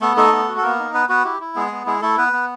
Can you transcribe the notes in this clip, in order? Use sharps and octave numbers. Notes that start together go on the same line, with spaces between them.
A3 B3 A4
A3 D#4 A4
B3
F#4
A4
A#3 B3 A#4
D#4
B3 B4
B3 F#4 B4
E4 G4
E4
G#3 B3 G#4
B3
G#3 E4 G#4
A3 E4 A4
B3 B4
B3